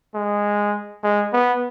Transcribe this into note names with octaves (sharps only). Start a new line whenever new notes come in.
G#3
G#3
B3